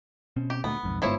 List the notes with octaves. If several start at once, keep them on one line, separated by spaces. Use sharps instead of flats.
B2 C4 C#4
G4
D2 A#2 A3 B3
B1 F2 G#2
G1 G#2 F3 B3 E4 C#5